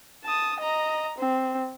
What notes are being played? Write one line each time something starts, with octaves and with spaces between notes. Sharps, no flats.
A5 D#6
D#5 A#5
C4